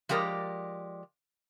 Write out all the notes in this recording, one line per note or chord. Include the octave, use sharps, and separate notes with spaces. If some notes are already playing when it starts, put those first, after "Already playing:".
F3 G#3 G4 A#4 D5